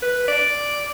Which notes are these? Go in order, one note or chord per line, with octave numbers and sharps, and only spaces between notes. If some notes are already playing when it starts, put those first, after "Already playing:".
B4
D5